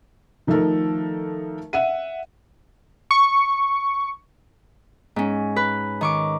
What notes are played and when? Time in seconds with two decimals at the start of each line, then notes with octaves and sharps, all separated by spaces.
0.47 D#3 F3 A3 D#4 A4 A#4
1.73 E5 F#5 D#7
3.11 C#6
5.16 G#2 C#4
5.56 B4
6.01 D#3 C#6 D6